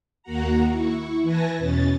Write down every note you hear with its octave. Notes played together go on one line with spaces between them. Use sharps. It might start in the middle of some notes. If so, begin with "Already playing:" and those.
D#2 A#3 F#4 F#5 A#5
E4 C#6
E3 E4 B4 G#5 A5 A#6
E2 B2 C#4 A6